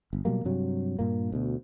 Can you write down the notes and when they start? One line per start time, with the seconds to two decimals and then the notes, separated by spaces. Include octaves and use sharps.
0.13 G1
0.25 B2 F#3 G3 A#3
0.45 G2 C3 F#3
0.99 G2 A#2 A#3
1.32 D2 B2